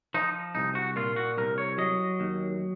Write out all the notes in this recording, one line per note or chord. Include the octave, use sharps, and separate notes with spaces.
F3 D#4
C2 D#4
F#4
A#2 F4
F#4
C2 A#4
C#5
F#3 D#5
D#2